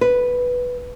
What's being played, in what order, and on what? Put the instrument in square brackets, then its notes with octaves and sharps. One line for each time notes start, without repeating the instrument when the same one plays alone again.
[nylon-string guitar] B4